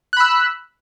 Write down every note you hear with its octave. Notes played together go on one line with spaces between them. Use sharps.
B5 E6 F#6